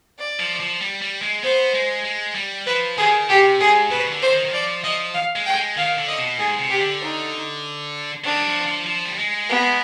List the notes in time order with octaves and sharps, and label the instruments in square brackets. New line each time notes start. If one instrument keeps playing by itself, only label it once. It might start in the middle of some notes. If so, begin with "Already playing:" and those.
[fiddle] D5
[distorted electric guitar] F3
F3
G3
G3
G#3
[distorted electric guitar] B3 [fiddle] C5
[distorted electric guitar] G#3
G#3
G3
[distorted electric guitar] F3 [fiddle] B4
[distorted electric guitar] D#3 [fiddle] G#4
[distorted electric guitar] C3 [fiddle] G4
[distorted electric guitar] G#2 [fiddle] G#4
[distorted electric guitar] B2 [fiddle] B4
[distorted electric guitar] D#3
D3
[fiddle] C5
[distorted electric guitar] D#3
D#3
[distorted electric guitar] F3 [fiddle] D5
[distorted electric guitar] F3 [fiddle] D#5
[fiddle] F5
[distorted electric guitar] G#3
[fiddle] G5
[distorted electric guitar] G#3
[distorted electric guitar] D#3 [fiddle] F5
[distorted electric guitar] D3
[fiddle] D#5
[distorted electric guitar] B2
[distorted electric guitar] G#2 [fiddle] G#4
[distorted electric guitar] C3
[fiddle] G4
[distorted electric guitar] D3
[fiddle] D#4
[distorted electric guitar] D#3 [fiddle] D4
[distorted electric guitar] G3
F3
F3
F3
G3
G#3
[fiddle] B3